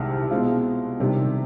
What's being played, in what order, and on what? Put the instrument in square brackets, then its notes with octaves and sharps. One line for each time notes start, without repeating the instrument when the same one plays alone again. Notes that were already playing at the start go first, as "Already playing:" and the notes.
Already playing: [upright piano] C2 C3 D#3 G#3
B2 G#3 C4 F4
C3 D#3 G3 D4 G4